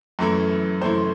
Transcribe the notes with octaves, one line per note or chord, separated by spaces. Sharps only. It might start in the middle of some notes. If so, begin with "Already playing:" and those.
F#2 E3 A3 E4
F#2 E3 A3 E4 C5